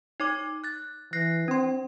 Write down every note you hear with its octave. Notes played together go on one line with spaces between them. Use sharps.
D#4 C#5 D6
F#6 A6
E3 F#6 A#6 C7
C4 D4 C6